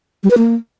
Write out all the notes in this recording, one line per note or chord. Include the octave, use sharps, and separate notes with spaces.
G3
B4
A#3